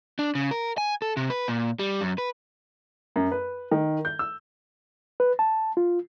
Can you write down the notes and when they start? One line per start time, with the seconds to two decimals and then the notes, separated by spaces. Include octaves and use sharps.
0.19 D4
0.35 C#3
0.51 A#4
0.78 G#5
1.02 A4
1.17 C3
1.30 B4
1.48 A#2
1.79 G3
2.01 F#2
2.18 B4
3.16 F#2
3.32 B4
3.71 D#3
4.05 G6
4.19 E6
5.20 B4
5.39 A5
5.77 F4